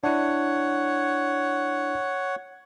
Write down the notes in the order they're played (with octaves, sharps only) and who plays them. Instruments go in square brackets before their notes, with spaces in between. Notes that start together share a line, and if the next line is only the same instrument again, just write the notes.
[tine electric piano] D4 E4 [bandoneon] C#5 F#5